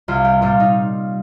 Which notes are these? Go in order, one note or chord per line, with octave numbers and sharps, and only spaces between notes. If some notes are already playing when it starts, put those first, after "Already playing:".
C2 F4
G4
A#2 G3 F4
D#4